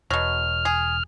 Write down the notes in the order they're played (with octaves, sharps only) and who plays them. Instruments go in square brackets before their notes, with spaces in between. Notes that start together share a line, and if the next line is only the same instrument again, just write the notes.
[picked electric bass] E1 [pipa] B2 F#3 [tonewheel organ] F6
[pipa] G#4